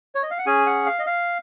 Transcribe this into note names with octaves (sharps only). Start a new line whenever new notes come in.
C#5
D#5
F5
F#5
C#4 G#4 G#5
F#5
F5
D#5
F5